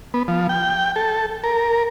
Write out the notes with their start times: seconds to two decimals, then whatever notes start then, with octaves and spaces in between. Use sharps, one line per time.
0.14 B3
0.28 F3
0.49 G5
0.96 A4
1.44 A#4